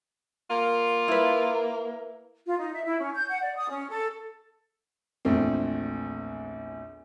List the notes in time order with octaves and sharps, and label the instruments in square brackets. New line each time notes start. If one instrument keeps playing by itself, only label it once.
[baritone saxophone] A#3 [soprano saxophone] F4
[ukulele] E4 B4
[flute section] F4
D#4
E5
E4
C#4
G6
F#5
D5
D#6
C#4
A4
[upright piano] A#1 E2 A3 C4